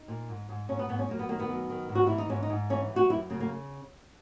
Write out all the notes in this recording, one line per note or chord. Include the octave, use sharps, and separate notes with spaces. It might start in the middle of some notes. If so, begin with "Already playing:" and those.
Already playing: D#4
A#2
G#2
G#2
G#2 C#4
B3
G#2 B3
C#4
F#2 A#3
B3
D#3 A#3
B3
F#2
D#3
G#2
F#4
E3 E4
D#4
G#2 C#4
D#4
G#2
E3 C#4
F#2
F#4
F#2 E4
C#3 A#3
A#3